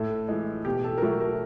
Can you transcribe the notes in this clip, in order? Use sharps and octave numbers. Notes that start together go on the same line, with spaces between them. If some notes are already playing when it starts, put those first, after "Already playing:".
Already playing: A2 A4
E3 G#3
B2 G4
A4
A#4
F#3 A3 A4
A#4